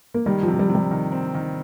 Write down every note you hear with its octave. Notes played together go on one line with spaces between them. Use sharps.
A#3
D#3 G3
F3
C3
F3
G3
C3
G3
D#3
C4
D#3